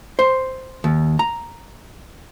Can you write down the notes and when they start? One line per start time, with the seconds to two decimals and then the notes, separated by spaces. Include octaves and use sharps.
0.19 C5
0.84 D#2
1.19 A#5